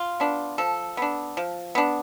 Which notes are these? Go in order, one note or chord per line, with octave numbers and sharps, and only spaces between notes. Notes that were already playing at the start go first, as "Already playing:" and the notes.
Already playing: F4
B3 D4
F3 A4
B3 D4
F3
B3 D4